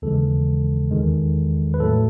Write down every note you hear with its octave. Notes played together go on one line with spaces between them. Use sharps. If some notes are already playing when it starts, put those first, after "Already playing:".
D#2 C#3 E3 G#3 A4
E2 D#3 G#3
B4
A2 F#3 A3 A4